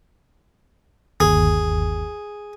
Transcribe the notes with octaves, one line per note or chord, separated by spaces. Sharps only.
G1 D#2 G#4